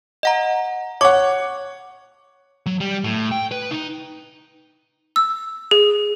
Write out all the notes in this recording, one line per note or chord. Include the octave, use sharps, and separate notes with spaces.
D#5 F#5 A#5
C#5 F#5 D6
F#3
G3
A2
G5
B4
D#4
E6
G#4